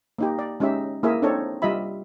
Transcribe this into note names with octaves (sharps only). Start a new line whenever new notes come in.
A#3 D#4 G4
D5
G#3 C#4 D#4 G4 E5
A#3 E4 G#4 A#4 E5
C4 D4 D#4 A4 C#5
G3 F4 D#5 E5 B5